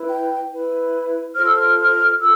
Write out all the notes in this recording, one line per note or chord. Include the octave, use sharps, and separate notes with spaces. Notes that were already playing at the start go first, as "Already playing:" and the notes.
Already playing: E4 B4
G5
E4 B4
F4 A4 C5 F6
E6
F6
F6
F4 A4 E6